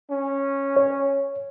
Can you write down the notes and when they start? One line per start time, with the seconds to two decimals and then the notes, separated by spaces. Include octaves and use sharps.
0.11 C#4
0.76 C#5